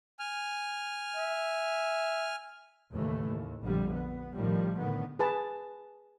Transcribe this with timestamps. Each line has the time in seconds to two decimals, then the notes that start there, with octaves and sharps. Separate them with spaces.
0.19 G#5 F6
1.16 E5
2.92 D#2 A2 C#3 E3 A3
3.26 D#2
3.63 A#1 F2 D3 G3
3.91 B3
4.34 A2 D#3 F3 G3
4.77 A2 D3 D#3 B3
5.19 G#4 B4 A5